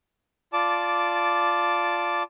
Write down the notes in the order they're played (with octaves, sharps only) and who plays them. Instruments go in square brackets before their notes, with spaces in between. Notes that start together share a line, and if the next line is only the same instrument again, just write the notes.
[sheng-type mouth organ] F4 D5 A5 D6